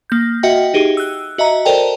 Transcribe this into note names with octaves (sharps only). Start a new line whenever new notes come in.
A#3 G6
F#4 D#5 E5 F#5 G5
D#4 G4 G#4
E6 F#6
F#4 D#5 E5 A#5
A4 A#4 C5 D5 G5 A5